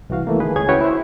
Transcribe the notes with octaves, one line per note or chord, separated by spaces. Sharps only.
C2 E3 F#4 F5
E3 A3 A#3
D#3 G#4 B4
C#2 G#4 C#5 G#6
C#4 E4 F#4 B4 C#5 G5
E4 C5